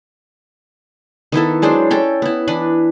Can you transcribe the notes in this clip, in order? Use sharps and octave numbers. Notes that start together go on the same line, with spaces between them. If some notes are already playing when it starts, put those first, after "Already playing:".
D#3 B3 E4 A4
F#3 G#3 D4 C5
C#4 A4 G5
B3 E4
E3 D4 B4